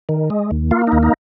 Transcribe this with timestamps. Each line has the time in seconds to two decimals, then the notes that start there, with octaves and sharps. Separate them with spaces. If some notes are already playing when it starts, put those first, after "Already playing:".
0.09 D#3
0.30 G#3
0.51 D#2
0.71 A#3 F4
0.87 D#2 D#4
1.03 D#4